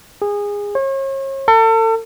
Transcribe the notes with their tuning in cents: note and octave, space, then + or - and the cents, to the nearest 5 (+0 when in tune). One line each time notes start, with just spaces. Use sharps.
G#4 -20
C#5 -40
A4 +35